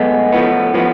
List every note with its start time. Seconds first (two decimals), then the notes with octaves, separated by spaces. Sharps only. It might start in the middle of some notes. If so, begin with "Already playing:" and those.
Already playing: B1 A2 G#3 B3
0.32 A2 F3 B3
0.74 A2 F3 B3